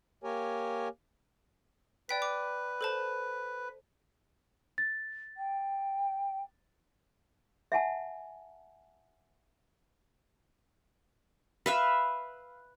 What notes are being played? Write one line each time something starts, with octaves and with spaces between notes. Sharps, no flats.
A#3 G4 A#4 C#5 G#5
B4 D5 G5 B6
D6
A4 C5 A5
A6
G5
E5 F#5 G#5 A5
B4 E5 F5